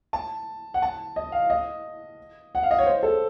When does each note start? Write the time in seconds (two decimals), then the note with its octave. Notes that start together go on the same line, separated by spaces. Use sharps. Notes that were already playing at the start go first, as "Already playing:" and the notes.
0.13 A5
0.74 F#5
0.82 A5
1.16 D#5
1.32 F5
1.50 D#5
2.55 F#5
2.63 F5
2.71 D#5
2.78 C#5
2.86 C5
3.03 A4